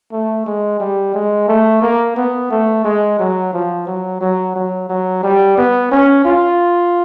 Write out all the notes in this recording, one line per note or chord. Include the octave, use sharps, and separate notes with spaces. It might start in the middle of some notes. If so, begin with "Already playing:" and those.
A3
G#3
G3
G#3
A3
A#3
B3
A3
G#3
F#3
F3
F#3
F#3
F#3
F#3
G3
B3
C#4
F4